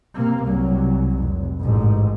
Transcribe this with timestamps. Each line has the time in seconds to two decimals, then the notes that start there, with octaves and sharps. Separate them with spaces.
0.14 C3 A#3
0.44 C2 F#3
1.19 F1
1.60 A1 G#2